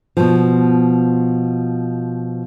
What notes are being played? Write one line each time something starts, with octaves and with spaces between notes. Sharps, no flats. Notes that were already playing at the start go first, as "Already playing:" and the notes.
B2 F3